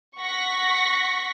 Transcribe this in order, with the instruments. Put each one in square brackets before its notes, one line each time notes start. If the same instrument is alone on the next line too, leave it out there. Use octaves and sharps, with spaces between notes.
[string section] F#5 C#6 A#6 B6